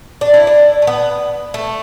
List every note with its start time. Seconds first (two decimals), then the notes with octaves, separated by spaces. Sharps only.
0.21 D4
0.34 E4
0.47 D4
0.82 A3
0.87 B3
1.54 A3